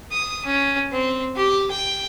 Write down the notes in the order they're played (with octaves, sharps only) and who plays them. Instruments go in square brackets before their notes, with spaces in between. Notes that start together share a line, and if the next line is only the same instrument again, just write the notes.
[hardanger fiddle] D#6
C#4
C4
G4
G5